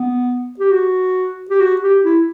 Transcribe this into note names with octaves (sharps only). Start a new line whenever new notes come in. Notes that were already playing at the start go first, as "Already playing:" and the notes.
Already playing: B3
G4
F#4
G4
F#4
G4
E4